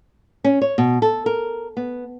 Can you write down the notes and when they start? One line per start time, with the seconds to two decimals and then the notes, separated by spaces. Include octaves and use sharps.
0.44 C#4
0.61 C#5
0.78 B2
1.02 A4
1.26 A#4
1.77 B3